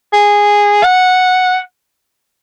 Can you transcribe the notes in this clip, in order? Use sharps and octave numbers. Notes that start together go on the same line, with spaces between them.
G#4
F#5